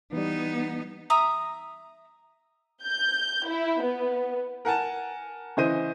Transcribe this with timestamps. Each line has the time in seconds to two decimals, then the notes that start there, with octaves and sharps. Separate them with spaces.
0.12 E3 G3 B3 D#4
1.10 E5 A#5 D#6
2.85 G6
3.48 E4
3.83 B3
4.65 A#4 F#5 G#5 A5
5.57 C#3 E3 C5 D#5 D#7